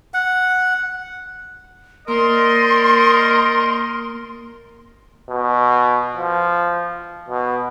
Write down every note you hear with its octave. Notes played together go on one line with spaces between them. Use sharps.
F#5
A#3 A#4 C5 D5 D#5 C6
B2
F3
B2